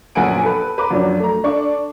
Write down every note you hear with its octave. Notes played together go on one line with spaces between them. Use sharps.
A#1 F#2 B3 F#5 G#5 D7
A4 B4
B4 A#5 D6
F#2 F3 F#3 D4
A3 A#5
D4 A4 D5 C#6